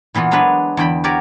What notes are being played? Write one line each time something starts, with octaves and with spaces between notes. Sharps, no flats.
A#2 E3 B3 F4 F#4
F#3 G#3 B3 D4 B4 C#5
E2 D3 G5 B5
F#4 G4 A#4 C#5 D5 G#5